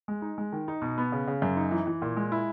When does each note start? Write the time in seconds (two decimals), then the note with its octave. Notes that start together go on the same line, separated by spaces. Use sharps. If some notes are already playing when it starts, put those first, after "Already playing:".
0.08 G#3
0.22 D#4
0.38 G#3
0.52 D#3
0.68 D#4
0.82 B2
0.98 B3
1.12 C#3
1.27 C#3
1.42 F#2
1.57 D#4
1.71 E3
1.87 E3
2.02 A#2
2.17 G#3
2.32 E4